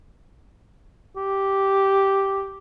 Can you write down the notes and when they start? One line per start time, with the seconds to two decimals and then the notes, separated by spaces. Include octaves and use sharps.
1.16 G4